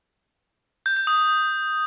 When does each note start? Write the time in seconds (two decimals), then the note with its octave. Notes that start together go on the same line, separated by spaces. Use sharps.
0.86 G6
0.97 G6
1.07 D#6